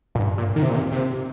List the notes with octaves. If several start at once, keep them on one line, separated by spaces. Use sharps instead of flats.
A#2
G2
A#2
D#3
C3
A#2
C3
C3